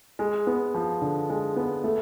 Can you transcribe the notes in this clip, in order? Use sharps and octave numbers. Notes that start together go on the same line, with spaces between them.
G#3
B3
F3
D3
G#3
B3
A3